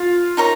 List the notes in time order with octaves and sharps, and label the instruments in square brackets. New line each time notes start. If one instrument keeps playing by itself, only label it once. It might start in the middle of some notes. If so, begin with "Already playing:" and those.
Already playing: [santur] F4
[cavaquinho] D#4 A#4 C#5 A#5